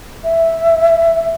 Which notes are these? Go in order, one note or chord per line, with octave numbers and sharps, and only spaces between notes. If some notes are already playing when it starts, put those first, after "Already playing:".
E5